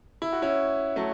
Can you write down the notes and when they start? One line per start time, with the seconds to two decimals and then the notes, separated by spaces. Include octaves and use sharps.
0.22 E4
0.33 F#4
0.42 C#4 E4
0.96 F#3 A3